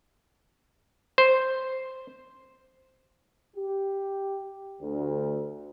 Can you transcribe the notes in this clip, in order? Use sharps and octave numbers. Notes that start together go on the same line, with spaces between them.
C5
G4
D2